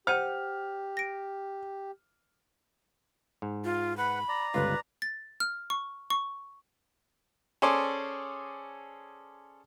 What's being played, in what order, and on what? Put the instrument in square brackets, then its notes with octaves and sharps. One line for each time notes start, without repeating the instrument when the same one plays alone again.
[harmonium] G4 [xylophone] C5 F#5 D#7 [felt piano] F6
[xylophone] A#6 D7
[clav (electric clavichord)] G#2
[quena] F4
[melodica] B4 F#5 [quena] B5
[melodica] D5 A#5
[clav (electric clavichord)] G1 C#2 F4 [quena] B4
[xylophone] A6
F6
C#6
C#6
[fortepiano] C#4 G#4 A4 C5 D5